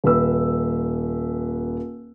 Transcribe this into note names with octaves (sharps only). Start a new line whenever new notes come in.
D#1 B4 E6